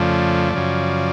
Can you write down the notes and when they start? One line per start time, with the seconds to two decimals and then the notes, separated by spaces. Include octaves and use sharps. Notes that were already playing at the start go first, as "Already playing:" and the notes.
Already playing: F2 C#3 F3 A3 D5
0.53 F#2 C#3 F3